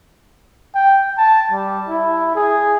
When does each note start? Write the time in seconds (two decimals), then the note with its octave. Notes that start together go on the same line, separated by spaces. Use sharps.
0.75 G5
1.18 A5
1.51 G3
1.88 E4
2.36 G#4